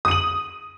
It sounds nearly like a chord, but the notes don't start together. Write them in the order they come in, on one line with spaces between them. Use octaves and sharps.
D#6 D#7 F#7